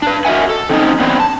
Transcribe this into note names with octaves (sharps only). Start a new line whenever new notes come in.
D4 B4
F#4 A#4 D#5 E5 F#5 G#5
A4
D#3 C4 C#4 D#4
F#3 B3 C4 D4
A5